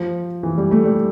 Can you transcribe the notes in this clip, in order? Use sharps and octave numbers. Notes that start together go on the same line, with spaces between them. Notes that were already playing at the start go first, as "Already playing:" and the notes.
Already playing: F3
E3
G3
A3
G3